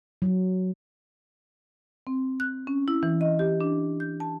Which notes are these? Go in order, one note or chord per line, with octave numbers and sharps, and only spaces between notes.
F#3
C4
F#6
C#4
E4
E3
D#5
G4
D4
G6
A5